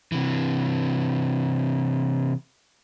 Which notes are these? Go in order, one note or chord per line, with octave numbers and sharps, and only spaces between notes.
C3 E3